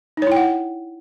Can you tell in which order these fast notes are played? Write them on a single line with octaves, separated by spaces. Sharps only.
D#4 C#5 E4 G5 F#5